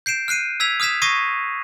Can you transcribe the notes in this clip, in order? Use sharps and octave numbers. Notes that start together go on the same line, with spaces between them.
G6 C7 D7 E7
F6 F#6 C7 D#7
E6 G#6 B6 F7
D#6 F6 G#6 B6 E7
C#6 D#6 G#6 A#6 C7 D#7